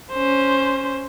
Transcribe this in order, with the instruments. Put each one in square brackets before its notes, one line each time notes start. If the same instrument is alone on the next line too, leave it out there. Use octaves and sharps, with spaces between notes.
[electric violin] C#4 C5